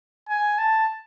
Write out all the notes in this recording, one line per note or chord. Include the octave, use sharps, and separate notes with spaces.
G#5
A5